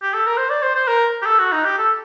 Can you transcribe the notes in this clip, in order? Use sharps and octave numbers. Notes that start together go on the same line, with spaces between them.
G4
A4
A#4
C5
D5
C5
C5
A#4
G4
A4
F#4
D#4
G4
A4